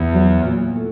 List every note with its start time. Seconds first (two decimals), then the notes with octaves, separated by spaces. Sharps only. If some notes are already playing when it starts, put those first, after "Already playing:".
Already playing: E2
0.13 F#3
0.44 A#2
0.75 A3